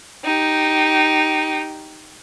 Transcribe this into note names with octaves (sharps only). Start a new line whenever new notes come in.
D#4 G4